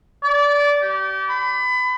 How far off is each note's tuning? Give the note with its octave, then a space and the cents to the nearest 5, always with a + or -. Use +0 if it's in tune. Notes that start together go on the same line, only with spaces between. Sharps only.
D5 -20
G4 -30
B5 +30